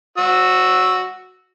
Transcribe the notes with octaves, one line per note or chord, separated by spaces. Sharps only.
F#4 E6